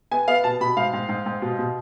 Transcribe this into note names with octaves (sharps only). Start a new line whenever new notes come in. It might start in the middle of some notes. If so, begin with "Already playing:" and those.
B3 G#5
B3 F5
B2 A5
B2 B5
G#2 F5
G#2
G#2
G#2
B2
B2